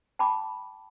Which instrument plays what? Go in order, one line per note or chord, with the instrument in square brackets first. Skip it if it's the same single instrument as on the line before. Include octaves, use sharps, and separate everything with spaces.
[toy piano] G5 A5 B5 D6